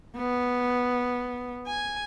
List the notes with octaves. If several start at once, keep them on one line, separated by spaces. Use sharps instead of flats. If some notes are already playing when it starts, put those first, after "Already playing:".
B3
G#5